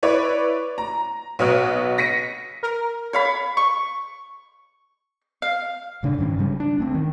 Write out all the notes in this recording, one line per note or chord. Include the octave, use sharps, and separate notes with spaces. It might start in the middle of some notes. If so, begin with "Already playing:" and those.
E4 B4 C#5 D5
A#5
B1 B3 F#4 C#5 D#6 F6
A#6 B6 C#7 D#7
A#4
C#5 F5 B5
C#6
F5
D1 C#3 D4
G2 D#3 C#4
C#3 G3
D4
D2 B3 C4
D#3